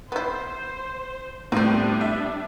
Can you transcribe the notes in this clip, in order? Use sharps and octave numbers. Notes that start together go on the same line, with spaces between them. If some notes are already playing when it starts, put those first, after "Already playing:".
B3 E4 C5
A2 G3 B3 C4 D4 C5
E5